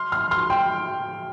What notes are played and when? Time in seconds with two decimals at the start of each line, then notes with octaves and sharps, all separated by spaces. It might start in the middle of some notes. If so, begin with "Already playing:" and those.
Already playing: C6 F6
0.12 C6 F6
0.31 C6 F6
0.50 G5 C6